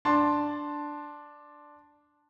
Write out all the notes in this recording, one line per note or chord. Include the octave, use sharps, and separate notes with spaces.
D4 A5 C6